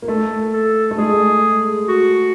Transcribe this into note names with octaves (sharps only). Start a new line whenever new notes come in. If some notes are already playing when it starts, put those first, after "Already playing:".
A#3
A3 A4
A4
A3
G#3 G#4
F#4